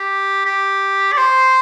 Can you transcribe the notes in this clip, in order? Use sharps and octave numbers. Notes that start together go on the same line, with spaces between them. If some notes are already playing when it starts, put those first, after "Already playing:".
Already playing: G4
G4
D5
C5